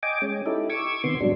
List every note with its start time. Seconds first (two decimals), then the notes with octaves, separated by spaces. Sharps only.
0.03 D#5 G5 G#5 D6
0.22 G#3 C#4
0.46 D#4 E4 G4 A4
0.70 C#6 D6 E6 G#6
1.04 C3 D#3 B3 C6
1.20 G#2 F#3 G3 D4